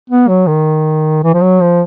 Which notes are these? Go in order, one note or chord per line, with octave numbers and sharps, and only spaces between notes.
B3
F#3
D#3
E3
F3
F#3
F3